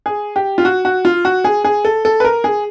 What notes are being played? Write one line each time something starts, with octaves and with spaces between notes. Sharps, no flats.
G#4
G4
F4
F#4
F#4
F4
F#4
G#4
G#4
A4
A4
B4
A#4
G#4